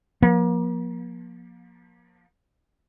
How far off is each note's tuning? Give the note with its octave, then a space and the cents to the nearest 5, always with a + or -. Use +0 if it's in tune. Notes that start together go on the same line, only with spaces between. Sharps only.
F3 +25 A#3 +35